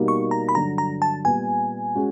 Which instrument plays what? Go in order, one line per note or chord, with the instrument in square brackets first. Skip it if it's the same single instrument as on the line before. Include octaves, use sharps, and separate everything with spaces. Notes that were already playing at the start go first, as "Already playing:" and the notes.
Already playing: [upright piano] B2 G3 A#3 D#4 G4
[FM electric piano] C#6
A#5
B5
[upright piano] G2 D3 F#3 [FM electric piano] A#5
[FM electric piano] A#5
A5
[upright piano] A#2 G3 B3 [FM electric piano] G#5
[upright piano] G#3 C#4 F#4